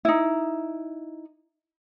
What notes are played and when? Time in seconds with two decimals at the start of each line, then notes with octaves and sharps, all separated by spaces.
0.05 D#4 E4